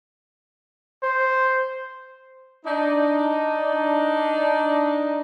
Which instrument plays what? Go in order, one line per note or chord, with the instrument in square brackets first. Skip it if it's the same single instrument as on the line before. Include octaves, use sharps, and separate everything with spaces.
[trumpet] C5
[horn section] D4 D#4